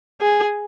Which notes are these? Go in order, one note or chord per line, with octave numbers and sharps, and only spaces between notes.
G#4